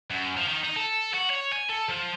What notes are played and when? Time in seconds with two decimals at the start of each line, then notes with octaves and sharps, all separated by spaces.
0.10 F#2
0.37 F3
0.48 D#3
0.64 D#4
0.76 A4
1.13 F#4
1.30 C#5
1.53 G#5
1.69 A4
1.89 F3